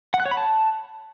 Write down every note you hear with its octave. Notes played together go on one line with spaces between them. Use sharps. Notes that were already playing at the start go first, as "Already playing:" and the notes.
F#5
F#6
C#5
B5
A5